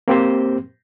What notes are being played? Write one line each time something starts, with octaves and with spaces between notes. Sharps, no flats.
A#3 C4 G4 C5